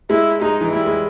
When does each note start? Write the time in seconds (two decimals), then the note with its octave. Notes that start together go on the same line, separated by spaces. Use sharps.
0.10 G#3 E4
0.41 G#3 D#4
0.61 E3
0.71 G3 E4
0.86 G#3